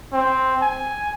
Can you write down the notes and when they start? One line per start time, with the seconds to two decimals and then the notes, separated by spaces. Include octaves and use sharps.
0.13 C4
0.62 G#5